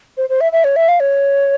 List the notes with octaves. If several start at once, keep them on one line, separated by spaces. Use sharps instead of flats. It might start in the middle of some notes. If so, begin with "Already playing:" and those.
C5
C5
E5
E5
C#5
E5
F5
C#5